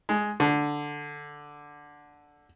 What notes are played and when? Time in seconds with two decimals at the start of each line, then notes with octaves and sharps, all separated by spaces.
0.09 G#3
0.40 D3